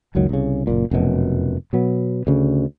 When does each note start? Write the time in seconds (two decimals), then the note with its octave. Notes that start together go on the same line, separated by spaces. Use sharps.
0.15 F#1 C#2 D#3 F#3
0.29 C2 C#3
0.67 F#1 A#2
0.91 F1 F#2 B2
1.73 B2 F#3 B3
2.27 D2 C#3